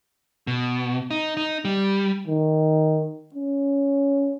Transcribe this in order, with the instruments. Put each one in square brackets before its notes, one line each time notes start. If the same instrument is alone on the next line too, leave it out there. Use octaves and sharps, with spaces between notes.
[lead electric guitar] B2
D#4
D#4
G3
[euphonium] D#3
C#4